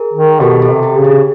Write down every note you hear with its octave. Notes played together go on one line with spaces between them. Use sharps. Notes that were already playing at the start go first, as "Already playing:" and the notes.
Already playing: G#4 A#4
D#3
B2 G4 A4
G4 A4
C3
G4
C#3
G#4